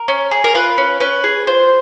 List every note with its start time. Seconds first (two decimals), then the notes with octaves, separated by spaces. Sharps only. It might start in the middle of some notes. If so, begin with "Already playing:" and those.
Already playing: A#4
0.08 C#4
0.31 G#4
0.44 A#4
0.54 F4 B4
0.78 C#4
1.00 C#4 B4
1.24 G#4
1.47 F4 C5